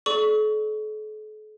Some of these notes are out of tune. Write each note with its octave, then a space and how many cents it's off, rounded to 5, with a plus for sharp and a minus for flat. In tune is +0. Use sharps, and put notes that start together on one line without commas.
A4 -45 D5 +0 C#6 +20